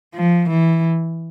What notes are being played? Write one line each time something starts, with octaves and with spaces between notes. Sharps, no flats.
F3
E3